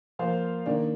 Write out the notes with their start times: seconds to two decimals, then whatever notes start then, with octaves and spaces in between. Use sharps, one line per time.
0.19 F3 A#3 F4 C5 F5
0.66 D#3 A#3 D4